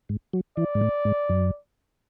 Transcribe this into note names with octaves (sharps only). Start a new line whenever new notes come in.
G#2
F#3
E3 D5
G#2
A2
G#2
F#2